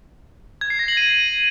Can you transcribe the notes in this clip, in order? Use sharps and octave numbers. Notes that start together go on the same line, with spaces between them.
G#6
C7
A#6
F#7
D#7